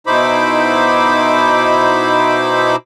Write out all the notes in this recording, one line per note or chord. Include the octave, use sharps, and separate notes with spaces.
B2 D#4 E4 C5 B5 D6